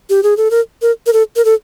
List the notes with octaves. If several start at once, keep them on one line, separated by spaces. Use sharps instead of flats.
G4
G#4
A4
A#4
A#4
A#4
A4
A#4
A4